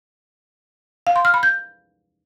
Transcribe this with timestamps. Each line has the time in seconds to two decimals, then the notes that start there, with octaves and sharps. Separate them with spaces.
1.07 F5
1.16 C6
1.25 F6
1.34 B5
1.43 G6